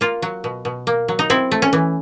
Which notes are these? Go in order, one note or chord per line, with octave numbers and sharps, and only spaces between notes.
A#3 F4
F#3
B2
B2
A#3
F#3
D#4
C4 E4
A3
C#4
E3